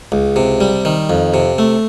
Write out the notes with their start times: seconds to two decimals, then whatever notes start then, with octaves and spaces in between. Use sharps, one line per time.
0.12 C#2
0.36 C3
0.61 G3
0.85 D#3
1.10 F2
1.34 C3
1.58 A3